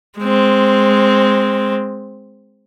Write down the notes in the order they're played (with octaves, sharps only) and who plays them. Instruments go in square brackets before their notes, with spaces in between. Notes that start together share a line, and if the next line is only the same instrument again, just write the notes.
[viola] G#3 C4